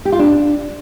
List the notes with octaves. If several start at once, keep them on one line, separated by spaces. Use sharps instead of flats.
G4
F4
D4